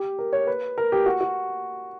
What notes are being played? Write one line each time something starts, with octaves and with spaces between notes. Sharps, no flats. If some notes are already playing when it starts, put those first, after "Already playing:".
Already playing: G4
A#4
C#5
B4
A#4
G4
F#4
F#4